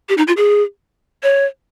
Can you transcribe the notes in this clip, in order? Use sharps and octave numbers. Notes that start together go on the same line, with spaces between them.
G4
D#4
F4
G#4
C#5